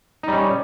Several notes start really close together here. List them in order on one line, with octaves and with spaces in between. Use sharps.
D#4 G3 C#4